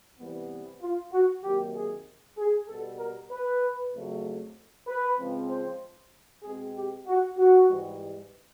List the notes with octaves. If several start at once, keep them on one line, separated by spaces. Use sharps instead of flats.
C3 E3 G3 B3
F4
F#4
C3 D#3 F#3 A#3 G4
G#4
G#4
B2 G3 B3 A4
A#4
B4
F2 C#3 F#3 A3
B4
C#3 F3 G#3 C4
C5
B2 G#3 C4 G#4
G4
F#4
F#4
G#2 E3 G3